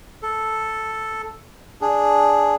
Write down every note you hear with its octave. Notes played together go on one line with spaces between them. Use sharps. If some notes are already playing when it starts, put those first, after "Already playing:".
A4
D4 G#4